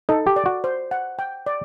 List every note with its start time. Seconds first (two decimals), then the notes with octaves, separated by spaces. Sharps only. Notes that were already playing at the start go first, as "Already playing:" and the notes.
0.09 D#4 A4
0.27 G4
0.36 D5
0.46 F#4
0.64 C5
0.91 F#5
1.19 G5
1.46 D5